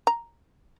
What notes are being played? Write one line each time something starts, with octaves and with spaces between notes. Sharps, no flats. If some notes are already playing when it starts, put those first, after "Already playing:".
A#5